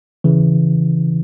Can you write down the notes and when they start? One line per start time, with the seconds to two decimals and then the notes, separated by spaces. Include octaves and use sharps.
0.24 C#3 E3